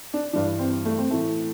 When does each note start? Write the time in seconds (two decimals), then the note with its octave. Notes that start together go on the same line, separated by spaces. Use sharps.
0.14 D4
0.33 G2 E3 D4
0.59 C4
0.85 A3
0.98 C4
1.10 A2 E3 A3